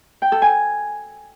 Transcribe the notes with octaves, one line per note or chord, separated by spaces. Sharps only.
G5
A4
G#5